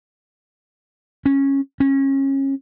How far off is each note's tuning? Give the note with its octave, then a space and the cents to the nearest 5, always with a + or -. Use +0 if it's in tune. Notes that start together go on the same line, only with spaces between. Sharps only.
C#4 -15
C#4 -25